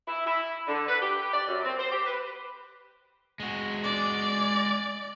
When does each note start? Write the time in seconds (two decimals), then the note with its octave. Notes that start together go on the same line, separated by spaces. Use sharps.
0.07 E4
0.27 E4
0.68 D3
0.88 B4
1.02 G4
1.34 D5
1.48 F#2
1.65 C4
1.79 C5
1.92 G4
2.06 B4
3.40 G#3 F#4
3.84 D5